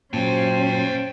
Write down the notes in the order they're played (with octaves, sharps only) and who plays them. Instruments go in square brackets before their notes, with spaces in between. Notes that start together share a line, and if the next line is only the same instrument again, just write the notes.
[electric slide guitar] A#2 F#3 [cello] C#4 C5 [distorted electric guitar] G5 A5